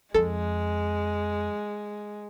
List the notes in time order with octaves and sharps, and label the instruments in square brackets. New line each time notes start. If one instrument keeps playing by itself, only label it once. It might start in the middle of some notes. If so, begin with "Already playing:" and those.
[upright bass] F2 [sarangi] G#3 [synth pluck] A4